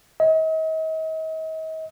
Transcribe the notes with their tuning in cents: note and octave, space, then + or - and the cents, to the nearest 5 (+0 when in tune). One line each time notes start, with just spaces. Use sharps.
D#5 +40